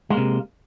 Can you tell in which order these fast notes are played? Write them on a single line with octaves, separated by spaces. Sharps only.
G#3 A#3 C3